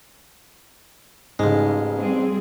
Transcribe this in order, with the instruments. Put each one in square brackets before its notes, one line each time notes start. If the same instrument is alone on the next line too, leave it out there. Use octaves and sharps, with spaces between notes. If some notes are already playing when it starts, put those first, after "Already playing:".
[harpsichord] A1 G#3 [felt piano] G#2 C#3
[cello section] G3 C4 G#4